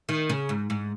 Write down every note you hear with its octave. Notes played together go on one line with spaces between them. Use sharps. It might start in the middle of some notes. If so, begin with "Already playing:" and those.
D#3
C#3
G#2
G#2